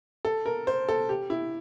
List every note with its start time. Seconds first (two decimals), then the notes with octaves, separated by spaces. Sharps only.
0.25 A4
0.46 A#4
0.67 C5
0.89 A4
1.09 G4
1.30 E4